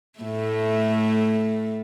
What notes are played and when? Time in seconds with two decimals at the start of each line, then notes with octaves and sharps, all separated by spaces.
0.19 A2 A3